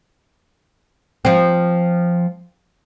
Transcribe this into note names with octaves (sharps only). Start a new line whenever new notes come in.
F3 C4